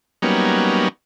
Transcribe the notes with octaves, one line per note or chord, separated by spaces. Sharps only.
F#3 G3 A#3 B3 C#4 D#4